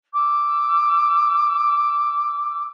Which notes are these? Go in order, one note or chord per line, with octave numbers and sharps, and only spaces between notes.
D6 E6